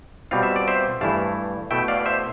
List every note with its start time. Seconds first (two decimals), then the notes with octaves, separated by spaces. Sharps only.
0.31 B2 G3 C4 F4 F5
0.43 E5
0.56 D5
0.67 C5 E5
1.01 G2 E3 A3 E4 F5 A5
1.71 B2 A3 E4 E5 G5
1.88 D5 F5
2.06 C5 E5